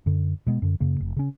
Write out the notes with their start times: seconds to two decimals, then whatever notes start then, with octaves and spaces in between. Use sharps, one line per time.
0.06 F#2 D3
0.47 B2 G#3 B3
0.62 F#2 D3
0.80 F#2 C#3 A#3
1.00 F1
1.16 C#3 C#4